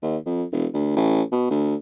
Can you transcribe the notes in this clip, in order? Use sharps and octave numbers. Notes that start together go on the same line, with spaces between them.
D#2
F2
E1
D2
A1
B2
D2